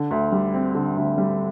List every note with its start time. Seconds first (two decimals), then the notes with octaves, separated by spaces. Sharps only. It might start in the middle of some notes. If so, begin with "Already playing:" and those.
Already playing: D3
0.11 D2
0.32 G3
0.54 C4
0.75 D3
0.96 D2
1.18 G3